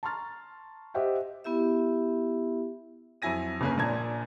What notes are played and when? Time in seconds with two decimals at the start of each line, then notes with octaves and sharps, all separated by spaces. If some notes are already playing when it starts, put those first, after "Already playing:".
0.03 A5 A#5 C6 C#6 F6 A6
0.94 G4 C5 D#5 E5 F#5 G5
1.44 B3 E4 G4 E5
3.22 F2 F#3 E4 G#5 A#6 D#7
3.61 G1 C#3 A#3 C#4 B4 G#5
3.77 A#1 A#2 D4 A5 A#5 G#6